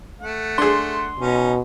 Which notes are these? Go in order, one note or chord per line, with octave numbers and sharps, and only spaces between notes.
A3 F#5
D4 G#4 C6
B2 C#4 D#4